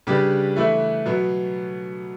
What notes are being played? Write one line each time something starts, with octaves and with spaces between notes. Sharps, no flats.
C#3 G3 D4 G4 B4
E3 A3 E4 B4
B2 F#3 B3